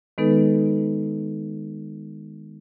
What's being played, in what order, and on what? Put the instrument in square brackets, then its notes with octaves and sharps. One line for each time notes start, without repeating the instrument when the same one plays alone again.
[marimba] D#3 G#3 B3 D#4 A4 B4